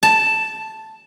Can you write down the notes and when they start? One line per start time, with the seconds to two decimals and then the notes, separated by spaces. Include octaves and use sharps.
0.03 A5